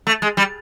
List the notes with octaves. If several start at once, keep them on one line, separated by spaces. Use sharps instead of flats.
A3
G#3
G3